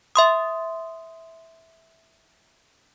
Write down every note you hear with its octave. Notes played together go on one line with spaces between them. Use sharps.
E5 C6 D#6